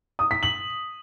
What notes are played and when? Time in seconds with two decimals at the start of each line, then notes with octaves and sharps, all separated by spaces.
0.19 D#6
0.31 B6
0.43 F#7